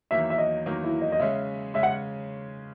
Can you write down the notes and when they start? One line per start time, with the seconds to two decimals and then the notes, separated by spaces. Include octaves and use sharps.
0.11 E2 D#3 F#3 A#3 E5
0.30 E5
0.38 D#5
0.66 E2 D#3 F#3 A#3
0.84 E4
1.01 D#5
1.12 D#5
1.19 C#3 G#3 C#4 E5
1.74 C#3 G#3 C#4 E5
1.83 F#5